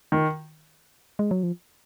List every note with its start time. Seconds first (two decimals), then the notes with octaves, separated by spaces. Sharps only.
0.12 D#3
1.19 G#3
1.31 F#3
1.43 F3